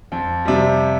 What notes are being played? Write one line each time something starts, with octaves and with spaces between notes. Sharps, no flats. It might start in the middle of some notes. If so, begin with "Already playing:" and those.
F2
C3 G3